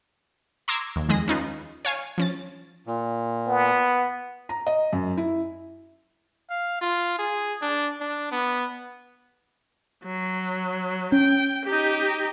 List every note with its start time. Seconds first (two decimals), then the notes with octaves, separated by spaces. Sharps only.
0.68 A#5 C6 D6 E6 G#6
0.96 D#2
1.09 F2 D#3 G#3 G#4 D#5 A#6
1.28 C#4 D#4 F4 B4
1.85 C#5 F5 G#5
2.18 F3 C#4 A6
2.87 A#2
3.47 B3
4.49 A#5
4.67 D#5
4.93 F#2
5.17 E4
6.50 F5
6.82 F4
7.19 G#4
7.62 D4
8.01 D4
8.32 B3
10.04 F#3
11.12 C#4 G5
11.65 D#4 G4